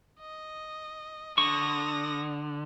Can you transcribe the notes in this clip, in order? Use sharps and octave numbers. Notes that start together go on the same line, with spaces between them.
D#5
D3 C#6 D#6 A#6